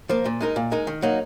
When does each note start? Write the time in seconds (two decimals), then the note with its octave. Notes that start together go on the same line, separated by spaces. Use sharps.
0.09 F3 A#3
0.26 A#2
0.41 G#3 D#4 A#4
0.56 A#2
0.72 G#3 D#4 A#4
0.87 D#3
1.02 F#3 A#3 D#4